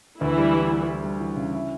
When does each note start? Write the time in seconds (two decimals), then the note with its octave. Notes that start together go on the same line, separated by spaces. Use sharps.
0.21 D2 E3 E4
0.38 G3
0.55 G3
0.71 G3
0.88 G3
1.04 G3
1.20 E3
1.36 C#3
1.53 E4